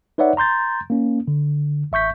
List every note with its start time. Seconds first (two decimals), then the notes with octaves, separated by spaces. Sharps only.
0.18 D#4 B4 C#5 D5 E5 F#5
0.37 A#5 C6 G6 A6
0.90 A#3 C#4
1.28 D3
1.92 A1 E5 C#6 G6 B6